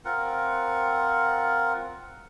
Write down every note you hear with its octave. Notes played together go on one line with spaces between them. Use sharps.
C4 F4 A#4 F#5